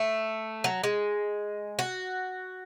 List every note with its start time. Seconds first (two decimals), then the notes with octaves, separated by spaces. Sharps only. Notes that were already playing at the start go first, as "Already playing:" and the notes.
Already playing: A3
0.64 F#3
0.84 G#3
1.79 F#4